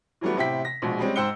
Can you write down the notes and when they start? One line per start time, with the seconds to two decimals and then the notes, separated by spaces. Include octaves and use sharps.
0.21 E3 F#3 G3 A3 B3
0.36 A1 C3 E4 G5 B6
0.65 A#6
0.82 A#1 B2 G#3
0.99 G3 G#3 C4 C#4
1.16 G#2 C5 G5 E6 C#7 G7